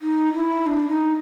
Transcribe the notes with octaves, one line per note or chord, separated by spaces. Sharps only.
D#4
E4
D4
D#4